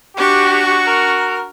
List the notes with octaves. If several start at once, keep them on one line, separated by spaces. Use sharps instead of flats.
D4 F#4 G4 C#6
A#4